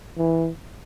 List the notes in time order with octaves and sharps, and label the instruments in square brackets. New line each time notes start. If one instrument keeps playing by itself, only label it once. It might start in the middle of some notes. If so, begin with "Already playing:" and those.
[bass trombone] E3